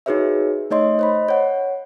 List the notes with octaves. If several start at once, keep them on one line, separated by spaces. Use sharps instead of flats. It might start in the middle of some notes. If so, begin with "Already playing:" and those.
D#4 F#4 G#4 B4 C#5 E5
A3 D#4 C#5 D#5 C6
C5 D#5 B5
C#5 F#5